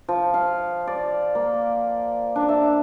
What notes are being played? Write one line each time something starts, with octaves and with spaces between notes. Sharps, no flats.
F3
F5
D5
A#3
D4
E5